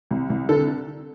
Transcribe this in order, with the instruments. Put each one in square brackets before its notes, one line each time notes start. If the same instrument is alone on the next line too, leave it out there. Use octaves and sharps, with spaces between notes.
[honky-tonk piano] C2
C2
D3 A4